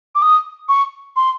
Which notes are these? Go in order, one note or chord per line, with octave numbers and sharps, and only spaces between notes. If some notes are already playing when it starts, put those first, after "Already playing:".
D6
D#6
C#6
C6